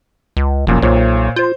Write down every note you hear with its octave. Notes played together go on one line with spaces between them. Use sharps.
C#2
F1 F#2 A#2 F3
B1 A#2 C5 C#5
F4 C5 G6